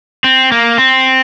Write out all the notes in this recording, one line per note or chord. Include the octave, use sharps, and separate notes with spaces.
C4
A#3
C4